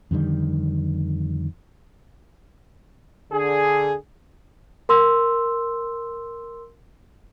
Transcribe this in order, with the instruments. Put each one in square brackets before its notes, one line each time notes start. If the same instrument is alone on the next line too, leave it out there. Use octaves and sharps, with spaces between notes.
[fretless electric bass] F2 D3 D#3 G3
[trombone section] D3 G#4
[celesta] A#4 C6 E6